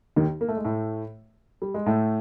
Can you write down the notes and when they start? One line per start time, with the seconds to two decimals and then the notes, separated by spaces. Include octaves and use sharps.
0.16 D#2 D#3
0.41 A#3
0.48 A3
0.57 G#3
0.64 A2 A3
1.62 G3
1.74 G#3
1.86 A2 A3